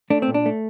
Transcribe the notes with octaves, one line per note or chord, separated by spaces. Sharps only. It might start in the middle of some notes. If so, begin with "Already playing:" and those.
A3 D4
C4
A#2
D4
A3